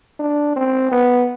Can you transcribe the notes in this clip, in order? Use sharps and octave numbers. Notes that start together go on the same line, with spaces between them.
D4
C4
B3